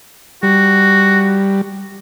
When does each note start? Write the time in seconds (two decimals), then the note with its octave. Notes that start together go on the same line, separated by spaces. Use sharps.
0.43 G3 F#4